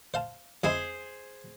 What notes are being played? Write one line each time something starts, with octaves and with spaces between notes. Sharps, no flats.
C5 F5 A5
F2 G#3 E4 G#4 C5